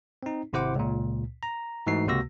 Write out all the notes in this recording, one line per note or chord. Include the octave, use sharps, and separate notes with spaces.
C4 D#4
G#1 C3 E4 C5 F#5 D6
C#2 A#2
A#5
G#2 E3 A3 D#4 F#4 C7
C#2 C3 A#3 F#4 E6 A#6